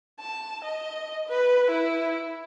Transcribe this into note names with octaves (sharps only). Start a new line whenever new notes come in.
A5
D#5
B4
E4